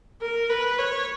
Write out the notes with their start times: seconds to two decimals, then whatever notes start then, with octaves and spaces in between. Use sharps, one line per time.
0.22 A#4
0.50 B4
0.79 C#5